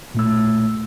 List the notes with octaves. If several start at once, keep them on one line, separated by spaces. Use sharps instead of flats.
A#2 A3 E6